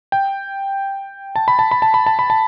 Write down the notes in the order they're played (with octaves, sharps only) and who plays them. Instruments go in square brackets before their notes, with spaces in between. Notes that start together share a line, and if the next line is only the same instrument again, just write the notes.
[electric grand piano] G5
A5
B5
A5
B5
A5
B5
A5
B5
A5